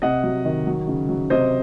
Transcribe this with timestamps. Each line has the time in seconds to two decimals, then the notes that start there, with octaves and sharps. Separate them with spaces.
0.02 C3 D#5 F#5
0.24 F#3
0.45 D#3
0.67 F#3
0.88 C#3
1.09 F#3
1.30 C3 C5 D#5